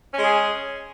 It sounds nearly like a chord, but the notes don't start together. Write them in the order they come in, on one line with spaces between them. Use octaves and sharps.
C#4 G#3 G#4